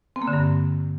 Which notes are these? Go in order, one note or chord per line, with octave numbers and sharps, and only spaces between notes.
C4
A#3
D3
G2